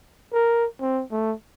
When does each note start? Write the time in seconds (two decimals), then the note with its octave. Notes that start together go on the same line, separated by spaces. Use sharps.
0.33 A#4
0.81 C4
1.12 A3